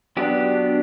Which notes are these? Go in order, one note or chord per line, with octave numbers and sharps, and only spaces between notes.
F#3 B3 D4 G4